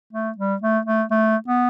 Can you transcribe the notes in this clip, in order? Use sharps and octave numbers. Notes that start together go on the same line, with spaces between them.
A3
G3
A3
A3
A3
B3